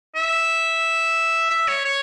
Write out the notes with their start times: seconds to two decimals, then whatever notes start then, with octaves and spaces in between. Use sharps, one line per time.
0.16 E5
1.51 E5
1.68 C#5
1.85 C#5